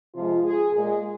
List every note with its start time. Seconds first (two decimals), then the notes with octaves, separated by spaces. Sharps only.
0.15 C3 F3 G#3 F4
0.44 G#4
0.73 A#2 G#3 G#4